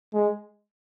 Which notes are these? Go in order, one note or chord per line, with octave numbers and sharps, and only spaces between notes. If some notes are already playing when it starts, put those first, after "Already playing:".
G#3